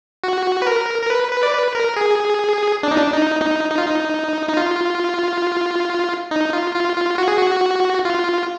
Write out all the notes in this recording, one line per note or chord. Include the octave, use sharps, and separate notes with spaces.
F#4
B4
A#4
A#4
B4
B4
D5
B4
A#4
G#4
D4
D#4
D4
D#4
D#4
D#4
F4
D#4
D#4
F4
D#4
F4
F4
F4
F#4
G#4
F#4
F4